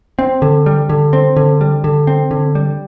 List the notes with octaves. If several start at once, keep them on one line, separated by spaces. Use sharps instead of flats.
C4
D3
G3
D3
C4
D3
G3
D3
C4
D3
G3